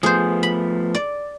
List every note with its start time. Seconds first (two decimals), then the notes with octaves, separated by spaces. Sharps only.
0.03 F3 A3 B3 G#4 C5
0.43 B5
0.95 D5